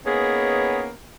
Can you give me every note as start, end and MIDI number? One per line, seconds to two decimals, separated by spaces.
0.05 0.88 58
0.05 0.88 59
0.05 0.88 61
0.05 0.88 63
0.05 0.88 68
0.05 0.88 71